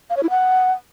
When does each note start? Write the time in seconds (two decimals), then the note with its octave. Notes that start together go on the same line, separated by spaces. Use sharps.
0.10 F5
0.17 C#5
0.23 E4
0.30 F#5